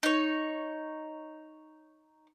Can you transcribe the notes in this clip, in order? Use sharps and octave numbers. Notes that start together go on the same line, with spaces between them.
D#4 C#5